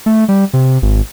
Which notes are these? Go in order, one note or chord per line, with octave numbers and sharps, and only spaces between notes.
A3
G3
C3
G#1